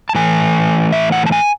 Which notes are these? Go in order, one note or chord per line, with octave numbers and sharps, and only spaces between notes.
A5
A2 E3 A3 G#5
E5
F#5
A5
G#5